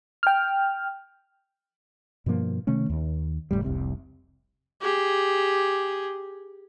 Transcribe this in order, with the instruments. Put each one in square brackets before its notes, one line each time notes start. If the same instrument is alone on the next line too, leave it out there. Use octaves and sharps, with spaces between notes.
[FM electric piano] G5 F6
[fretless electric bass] G2 B2 F3 A#3
C3 D#3 A3 C#4
D#2
F#1 C2 A2 G3
F1 C2 C3
[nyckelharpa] G4 G#4